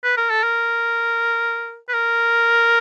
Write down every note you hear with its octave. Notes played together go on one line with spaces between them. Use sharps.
B4
A#4
A4
A#4
B4
A#4